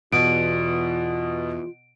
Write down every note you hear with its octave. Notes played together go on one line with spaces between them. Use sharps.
E2 B2 F4 D7